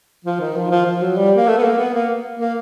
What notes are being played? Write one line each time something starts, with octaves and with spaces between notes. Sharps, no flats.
F3
D#3
F3
F3
F3
F#3
G3
A#3
A3
B3
A#3
B3
A#3
A#3